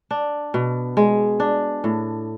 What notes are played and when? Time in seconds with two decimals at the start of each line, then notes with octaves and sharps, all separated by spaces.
0.11 D4
0.54 B2
0.97 G#3
1.40 D4
1.84 A2